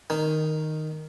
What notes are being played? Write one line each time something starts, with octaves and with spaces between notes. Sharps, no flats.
D#3